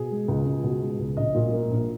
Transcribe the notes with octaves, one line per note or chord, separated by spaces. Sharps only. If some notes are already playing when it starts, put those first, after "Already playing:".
Already playing: B2 G#4
G#3
C#2
C#2
B2
G#3
C#2
A#1 D#5
A#2
A#3
A#1